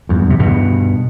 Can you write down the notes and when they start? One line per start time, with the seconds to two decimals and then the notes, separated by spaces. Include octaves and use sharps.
0.09 E2 G2
0.30 C3
0.39 G2 B2